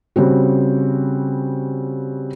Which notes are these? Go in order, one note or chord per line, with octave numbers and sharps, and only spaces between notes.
C#3 G3 C4 F#4